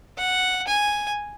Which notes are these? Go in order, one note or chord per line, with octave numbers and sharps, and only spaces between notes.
F#5
G#5